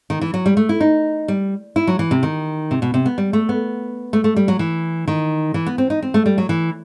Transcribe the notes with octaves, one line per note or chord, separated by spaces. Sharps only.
D#3
E3
F#3
G3
A3
E4
D#4
G3
E4
F#3
E3
C3
D#3
C3
B2
C3
B3
G3
A3
B3
A3
A3
G3
F#3
E3
D#3
E3
B3
C4
D#4
C4
A3
G3
F#3
E3